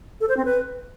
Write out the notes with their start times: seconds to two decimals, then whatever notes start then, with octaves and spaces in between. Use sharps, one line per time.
0.21 A4
0.29 C5
0.37 C4
0.45 B4